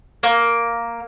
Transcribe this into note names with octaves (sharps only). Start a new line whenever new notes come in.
A#3